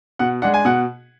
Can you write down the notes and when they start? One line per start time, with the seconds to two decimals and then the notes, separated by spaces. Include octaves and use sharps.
0.19 B2 F#5
0.42 G#3 D4 F#5
0.54 G#5
0.65 B2 F#5